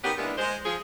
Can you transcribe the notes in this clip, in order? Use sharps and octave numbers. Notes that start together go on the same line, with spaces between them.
D#3 B3 C#4 G4
E3 G#3 A#3 B3 D4 E4
G#3 C5
F3 G#4